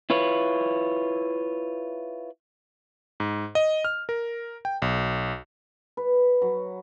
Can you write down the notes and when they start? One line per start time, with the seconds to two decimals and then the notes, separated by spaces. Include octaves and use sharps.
0.10 E4 F4 B4 C#5
3.20 G#2
3.55 D#5
3.85 F6
4.09 A#4
4.65 G5
4.82 B1
5.97 B4
6.42 F#3